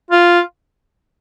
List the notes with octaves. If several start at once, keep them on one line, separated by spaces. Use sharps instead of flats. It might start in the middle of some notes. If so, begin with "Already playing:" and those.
F4